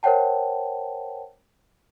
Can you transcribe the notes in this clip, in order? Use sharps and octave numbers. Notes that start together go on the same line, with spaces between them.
A#4 C5 C#5 F#5 G5 A5